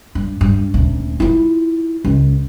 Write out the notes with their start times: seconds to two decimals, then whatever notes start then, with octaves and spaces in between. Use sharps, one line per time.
0.15 G2
0.41 G2
0.74 D#1 D2
1.20 E4 F4
2.05 C#2